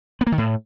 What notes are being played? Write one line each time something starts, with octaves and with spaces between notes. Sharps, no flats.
B3
A#3
D#3
A2